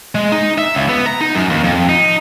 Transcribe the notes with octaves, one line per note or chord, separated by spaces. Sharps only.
G#3
D#4
E5
C#2
B3
A#5
D#4
F#2
D#2
F2
D#4